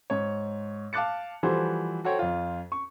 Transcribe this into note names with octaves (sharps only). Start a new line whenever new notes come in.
G#2 C#5
F5 A5 D6 F#6 A6 C#7
E3 F3 G3 F#4 A4 C5
F#4 A4 C5 C#5 F#5 G5
F2 F4
C#6